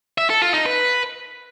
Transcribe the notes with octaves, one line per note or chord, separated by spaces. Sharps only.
E5
A4
F4
D#4
B4